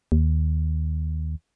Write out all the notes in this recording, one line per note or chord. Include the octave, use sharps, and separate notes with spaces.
D#2